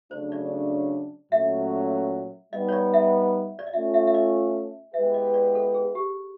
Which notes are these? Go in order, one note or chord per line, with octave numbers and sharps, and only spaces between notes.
C#3 F#3 A3 D4 C5
D5
A#2 F#3 A3 C#4 E5
G3 B3 D#4 D#5
C#5
D5
E5
D5
D#5
A3 C#4 F4 E5
E5
E5
D#5
G#3 B3 E4 G4 B4 E5
D#5
D5
A4
G#4
G4